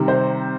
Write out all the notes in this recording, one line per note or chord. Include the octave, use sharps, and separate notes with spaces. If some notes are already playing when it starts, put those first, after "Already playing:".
Already playing: C3 D#3 G3
C5